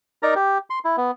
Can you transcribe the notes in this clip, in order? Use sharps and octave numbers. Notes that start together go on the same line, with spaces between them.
D#4 A#4 D5 A#5
G4
C6
E4
B3